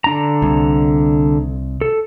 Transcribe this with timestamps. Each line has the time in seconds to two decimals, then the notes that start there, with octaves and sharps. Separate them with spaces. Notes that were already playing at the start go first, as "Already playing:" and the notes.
0.04 D3 D4 A#5
0.42 C2
1.81 A4